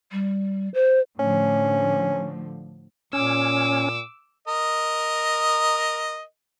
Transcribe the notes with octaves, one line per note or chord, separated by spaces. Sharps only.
G3
C5
A2 D3 F3 C#4
A#2 C#4 D6 E6
A#4 D#5